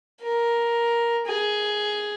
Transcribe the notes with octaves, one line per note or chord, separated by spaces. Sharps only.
A#4
G#4